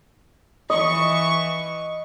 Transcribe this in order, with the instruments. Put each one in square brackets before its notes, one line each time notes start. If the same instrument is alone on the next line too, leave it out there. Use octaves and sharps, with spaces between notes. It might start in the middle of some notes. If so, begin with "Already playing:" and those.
[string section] E3 C#6 [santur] D#5